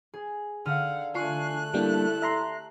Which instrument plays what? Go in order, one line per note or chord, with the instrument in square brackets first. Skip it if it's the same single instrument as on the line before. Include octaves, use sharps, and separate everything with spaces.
[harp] G#4
[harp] D3 F6 D#7 [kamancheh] F5 F#5
[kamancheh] A3 F#6 [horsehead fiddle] D4 G#5 [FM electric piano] F4 C7 [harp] C#6
[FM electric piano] G3 A#3 D4 [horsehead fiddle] E4 A4 [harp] G4
[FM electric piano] E5 A#5 C6